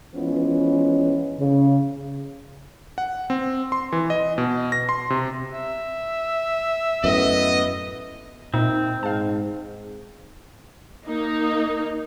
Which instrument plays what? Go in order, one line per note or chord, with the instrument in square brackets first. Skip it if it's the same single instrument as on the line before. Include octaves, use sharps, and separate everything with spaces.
[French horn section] E3 F3 G#3 B3 C#4
C#3
[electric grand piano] F#5
C4
C6
E3
D#5
B2
A#6
C6
C3
[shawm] E5
[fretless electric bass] F#2 A2 [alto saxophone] B3 [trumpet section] D#5
[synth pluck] A#2 D#4 E5 [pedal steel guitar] C4
[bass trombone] G#2 [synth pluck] F5 A5
[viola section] A#3 D#4